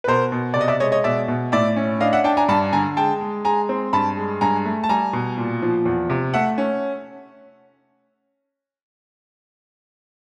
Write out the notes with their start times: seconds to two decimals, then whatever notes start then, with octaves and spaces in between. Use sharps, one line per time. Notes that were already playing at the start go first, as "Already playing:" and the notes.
0.04 B4
0.07 B2 A#4 C5
0.32 B2
0.54 C3 D5
0.61 D#5
0.68 D5 E5
0.80 G#3 C#5 D#5
0.92 C#5 D#5
1.04 B2 D5 E5
1.28 B2
1.52 A2 D5 E5
1.76 C#4
2.01 D4 D#5 F5
2.13 E5 F#5
2.24 D4 G5 A5
2.37 G#5 A#5
2.48 G2 A5 B5
2.73 D3 G#5 A#5
2.97 G#3 G5 A5
3.21 G#3
3.45 G#3 G#5 A#5
3.69 C4
3.93 G2 A5 B5
4.17 G#3
4.41 G2 G#5 A#5
4.65 A3
4.84 A5
4.89 G3 G#5 A#5
5.13 B2
5.38 A#2
5.62 F3
5.86 E2
6.10 C3
6.34 A3 E5 F#5
6.58 C#4